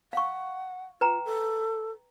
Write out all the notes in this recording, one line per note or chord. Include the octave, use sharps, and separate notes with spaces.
F5 F#5 C#6
F4 B4 G5 A#5
A4